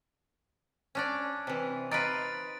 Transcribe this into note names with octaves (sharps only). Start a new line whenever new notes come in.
C#4 D4 D5
C3 E3
D#4 F4 B4 A6 D7